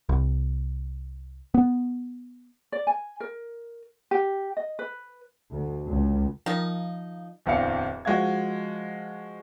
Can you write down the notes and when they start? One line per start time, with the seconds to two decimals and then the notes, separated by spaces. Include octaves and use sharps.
0.09 C2
1.54 B3
2.72 D5
2.87 G#5
3.20 A#4
4.11 G4
4.57 D#5
4.79 B4
5.50 D2
5.86 C#2
6.46 D#3 F3 D#4
7.46 D1 E2 C4 D4 F5 C#7
8.05 F3 G#3 F#4 F5 G#6